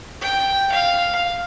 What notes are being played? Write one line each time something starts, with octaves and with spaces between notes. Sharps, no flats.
G5
F5